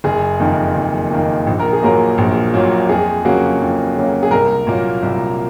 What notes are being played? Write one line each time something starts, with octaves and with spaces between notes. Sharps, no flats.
F#1 G#4
F2 D#3 A#3
F#1
F2 D#3 A#3
A#1
A#4
G#4
A#2 F#3 A#3 A#4
A#1
A#2 F#3 A#3
F2 G#4
C#3 F#3 A#3 F#4
F2
C#3 F#3 A#3
G#4
C2 A#4
A#2 F#3 A#3
C2